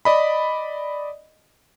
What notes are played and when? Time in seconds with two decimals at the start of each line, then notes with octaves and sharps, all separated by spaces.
0.05 D5 D#5 B5